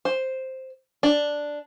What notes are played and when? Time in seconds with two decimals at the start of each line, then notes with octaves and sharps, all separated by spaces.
0.05 C5
1.03 D4